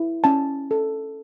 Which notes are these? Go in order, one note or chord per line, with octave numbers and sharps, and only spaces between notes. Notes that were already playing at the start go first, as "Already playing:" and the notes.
Already playing: E4
C#4 A5
A4